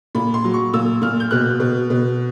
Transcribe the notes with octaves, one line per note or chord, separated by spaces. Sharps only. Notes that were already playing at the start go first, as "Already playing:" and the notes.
A#2 B5
C6
F#3
C#6
A#2 E6
A#2 F6
G6
B2 F#6
B2
B2